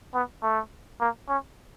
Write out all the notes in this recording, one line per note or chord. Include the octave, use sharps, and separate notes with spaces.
B3
A3
A#3
C#4